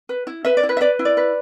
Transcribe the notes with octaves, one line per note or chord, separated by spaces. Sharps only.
B4
E4
B4 E5
D5
E4
B4
E5
B4 D5
E4
D5
B4